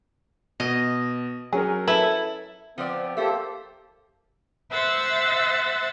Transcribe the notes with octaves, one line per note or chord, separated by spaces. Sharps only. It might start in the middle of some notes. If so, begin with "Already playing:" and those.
B2 D#5
F#3 C#4 G#4 A#4
E4 A4 B4
F3 B3 C4 D5
A#3 G4 A4 C5 E5
C5 E5 F#5 E6 A6